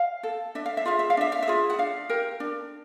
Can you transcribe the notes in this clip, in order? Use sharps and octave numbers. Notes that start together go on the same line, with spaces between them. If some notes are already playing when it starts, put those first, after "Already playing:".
Already playing: F5
A4
D4 E5
F5
E5
F4 G#4 F5
E5
F5
D4 E5
F5
E5
F4 G#4
F#5
D4 F5
G4 A#4
D4